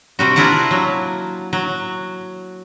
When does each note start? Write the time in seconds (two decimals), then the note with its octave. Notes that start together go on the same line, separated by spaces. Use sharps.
0.19 C3 G3 F#4
0.36 A#3 D4 E4 F4 D5 F#5
0.71 F#3
1.53 F#3